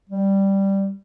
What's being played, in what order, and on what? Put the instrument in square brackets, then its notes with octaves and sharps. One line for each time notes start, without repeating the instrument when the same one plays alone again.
[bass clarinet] G3